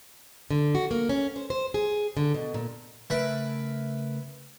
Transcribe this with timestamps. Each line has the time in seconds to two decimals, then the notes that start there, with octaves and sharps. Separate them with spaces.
0.51 D3
0.75 F#4
0.91 A#3
1.09 C#4
1.36 C5
1.50 C5
1.74 G#4
2.17 D3
2.34 B2
2.54 A#2
3.10 C#3 A3 E4 A#4 B4